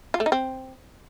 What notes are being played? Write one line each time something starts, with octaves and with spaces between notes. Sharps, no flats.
F4
A3
D#4
C4